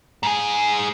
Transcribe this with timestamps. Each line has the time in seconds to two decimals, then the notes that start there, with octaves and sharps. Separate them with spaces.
0.23 G#2 G#4